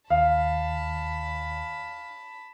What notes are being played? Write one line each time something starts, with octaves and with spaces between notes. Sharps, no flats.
D#2 F5 A5 B5